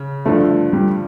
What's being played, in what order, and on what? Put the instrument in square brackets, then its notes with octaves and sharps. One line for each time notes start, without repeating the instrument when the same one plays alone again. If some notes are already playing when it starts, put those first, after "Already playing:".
Already playing: [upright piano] C#3
[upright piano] G2 D3 F3 [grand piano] A3
[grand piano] G3